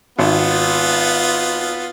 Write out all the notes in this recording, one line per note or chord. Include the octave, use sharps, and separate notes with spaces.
G#1 B3 F4